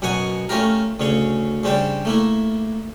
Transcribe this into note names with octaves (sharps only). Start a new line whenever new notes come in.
F#2 B2 F#3 F#5 G#5 D#6
A3 C#4 F4 G4 A#4
D2 C#3 C#4 C#5
C#3 G3 C4 D4 G5
A3 A#3 E4